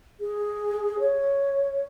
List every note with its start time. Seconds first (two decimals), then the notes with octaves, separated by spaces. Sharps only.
0.20 G#4
0.99 C#5